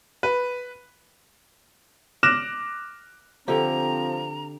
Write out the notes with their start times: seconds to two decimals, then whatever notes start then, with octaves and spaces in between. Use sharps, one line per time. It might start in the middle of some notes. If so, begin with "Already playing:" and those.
0.23 B4
2.23 D6 F6 F#6 A#6 E7
3.48 D3 F3 C4 G4 A#5